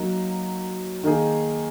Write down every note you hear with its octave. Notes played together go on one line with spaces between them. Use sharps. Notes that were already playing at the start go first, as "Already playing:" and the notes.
Already playing: F#3 A#3 D#4
D#3 A#3 D#4 G#4